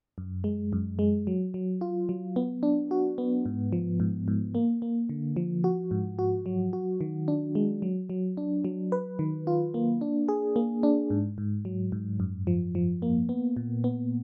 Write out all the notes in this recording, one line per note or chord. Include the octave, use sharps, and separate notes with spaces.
F#2
G#3
F#2
G#3
F#3
F#3
F4
F#3
B3
D4
F#4
B3
G#2
F3
G#2
G#2
A#3
A#3
D3
F3
F#4
G#2
F#4
F#3
F#4
D#3
D4
G#3
F#3
F#3
D4
F#3
B4
D#3
F4
A#3
D4
G#4
A#3
D4
G#2
G#2
F#3
G#2
F#2
F3
F3
A#3
B3
A#2
B3